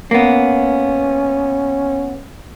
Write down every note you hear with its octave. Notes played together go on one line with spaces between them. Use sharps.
A#3 B3 C#4